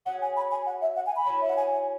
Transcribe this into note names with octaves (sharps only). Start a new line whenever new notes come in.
F#3 C#4 G#4 F#5
G#5
B5
G#5
F#5
E5
F#5
G#5
B5
F#3 C#4 E4
E5
F#5
G#5
G#5